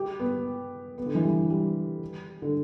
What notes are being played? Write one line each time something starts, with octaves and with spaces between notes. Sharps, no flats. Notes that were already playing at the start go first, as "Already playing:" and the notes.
Already playing: G4
B3
B3
D3
E3
G3
G3
D3